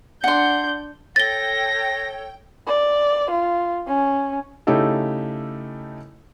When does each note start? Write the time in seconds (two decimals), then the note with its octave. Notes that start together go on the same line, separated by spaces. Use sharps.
0.24 D4 F#5 C6 G6
1.16 A4 C#5 G5 A6 A#6 G7
2.67 D5
3.30 F4
3.87 C#4
4.67 C#3 A3 D#4 E4 G4 A4